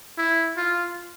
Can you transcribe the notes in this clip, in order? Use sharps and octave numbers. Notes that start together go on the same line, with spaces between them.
E4
F4